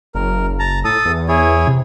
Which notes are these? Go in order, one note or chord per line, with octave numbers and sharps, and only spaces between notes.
F#1 A#4
A5 A#5
A2 A4 A5 D#6
E2
E4 G#4 C#5
C3